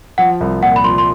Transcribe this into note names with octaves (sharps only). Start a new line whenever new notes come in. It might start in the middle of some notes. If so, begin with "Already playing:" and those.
F3 F#5
C2
A#2 F#5
B5
F3 C6
C6